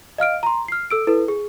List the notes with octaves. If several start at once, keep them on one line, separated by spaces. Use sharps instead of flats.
D#5 F5 F6 D7
A#5 C6
F6 C7
A4 E6 D7
E4 A4 B4
G#4